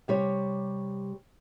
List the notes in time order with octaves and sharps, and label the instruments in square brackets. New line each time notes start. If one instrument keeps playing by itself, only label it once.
[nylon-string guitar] C3 G3 C#5